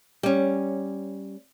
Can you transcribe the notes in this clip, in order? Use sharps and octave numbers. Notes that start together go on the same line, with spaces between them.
G3 C#4